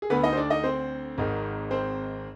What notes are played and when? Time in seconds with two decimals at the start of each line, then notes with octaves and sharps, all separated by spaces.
0.02 G#4
0.10 D2 D3 B3 B4
0.24 D#4 D#5
0.33 C5
0.37 D4 D5
0.50 D#4 D#5
0.64 C4 C5
1.18 G#1 G#2 D#3
1.71 C4 C5